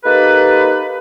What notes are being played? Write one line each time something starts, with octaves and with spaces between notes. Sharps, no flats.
A#3 D#4 G4 A4 B4